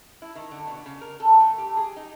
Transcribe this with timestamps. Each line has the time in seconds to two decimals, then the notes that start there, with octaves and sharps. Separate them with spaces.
0.22 E4
0.35 D#3
0.51 D3
0.67 B2
0.86 C#3
1.01 A#4
1.20 A4
1.40 A3
1.58 G4
1.77 G#4
1.96 D#4